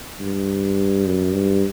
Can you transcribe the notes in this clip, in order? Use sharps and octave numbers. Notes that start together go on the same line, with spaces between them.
G2
F#2
G2